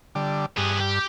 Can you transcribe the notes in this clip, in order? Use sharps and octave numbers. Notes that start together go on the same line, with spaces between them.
D3 G3
G2 B3 G#4
G4